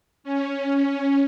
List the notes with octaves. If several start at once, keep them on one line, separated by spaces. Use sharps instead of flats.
C#4